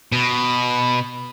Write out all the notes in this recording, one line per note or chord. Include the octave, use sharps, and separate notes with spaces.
B2